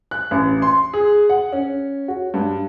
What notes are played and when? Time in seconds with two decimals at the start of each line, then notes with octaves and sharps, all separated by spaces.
0.11 F#6
0.31 A1
0.62 C6
0.93 G#4
1.30 F#5
1.53 C#4
2.08 F#4
2.34 G2